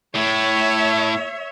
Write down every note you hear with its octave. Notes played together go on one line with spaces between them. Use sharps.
A2 C#5 E5